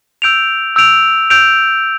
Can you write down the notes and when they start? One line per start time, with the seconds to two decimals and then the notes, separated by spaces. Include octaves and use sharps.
0.22 E6 G6 D7 F7
0.76 E6 G6 D7 F7
1.30 E6 G6 D7 F7